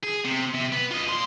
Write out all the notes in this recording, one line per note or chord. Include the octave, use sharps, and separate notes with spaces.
G#4
C3
C3
B3
F4 D#5
A#2 C6